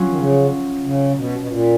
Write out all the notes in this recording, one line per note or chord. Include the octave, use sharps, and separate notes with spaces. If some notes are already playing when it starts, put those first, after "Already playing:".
Already playing: F#3 C#4 F4
D#3
C#3
C#3
B2
B2
A#2